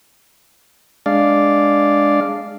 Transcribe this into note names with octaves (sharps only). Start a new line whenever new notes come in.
G#3 D4 D5 F5